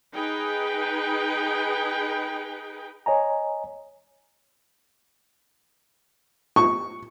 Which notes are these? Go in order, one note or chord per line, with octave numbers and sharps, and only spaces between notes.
D#4 G#4 B4 G5
C#5 D#5 G#5 A#5
C#6